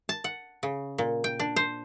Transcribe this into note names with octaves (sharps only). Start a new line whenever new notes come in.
A5
F#5
C#3
A#2
G5
D4
C5